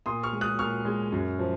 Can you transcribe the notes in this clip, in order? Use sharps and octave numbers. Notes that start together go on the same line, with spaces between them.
A#2 C6 D#6
C#6 F6
G#3
D#6 F#6
A#2 C#6 F6
G#3
F#2
F3